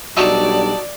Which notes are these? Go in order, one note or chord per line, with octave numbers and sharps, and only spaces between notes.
B1 G3 D4 D#4 F#4 D5 E5 A5